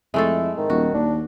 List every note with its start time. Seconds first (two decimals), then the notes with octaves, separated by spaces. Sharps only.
0.14 F2 G#3 A3 E4 A4
0.57 G#2 D#3
0.70 D#1 F#4
0.94 D#2 D4